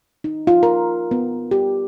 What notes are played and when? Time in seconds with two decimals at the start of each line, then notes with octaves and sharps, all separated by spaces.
0.24 D#4
0.47 F4
0.63 A#4
1.11 B3
1.51 G4